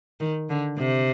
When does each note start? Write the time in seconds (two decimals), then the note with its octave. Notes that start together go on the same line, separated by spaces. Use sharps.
0.20 D#3
0.50 D3
0.78 C3